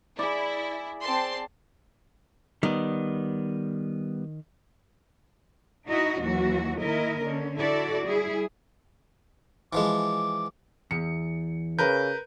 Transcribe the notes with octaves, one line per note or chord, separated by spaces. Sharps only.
E4 G#4 D5
C4 A5 C6
D#3 G3 B3
D#4 E4 F#4 D#5
D#2 E3 F#3 F#4
D#3 A#3 E4 A#4 D#5
D3 C#4
E4 F#4 A4 D5
G3 E4 G#4
E3 F3 G#3 D6
E2 C#7
C#3 A#4 B4 G6